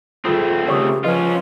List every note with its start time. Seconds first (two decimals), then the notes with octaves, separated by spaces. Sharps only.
0.25 D#1 A3 C4 F4 G#4 D#6
0.68 C#3 G4 A#4 C5 C#5 C#6 D#6
1.04 F3 C#4 E4 F4 B4 D#5